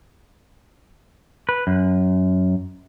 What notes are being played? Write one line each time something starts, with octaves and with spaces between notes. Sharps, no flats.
B4
F#2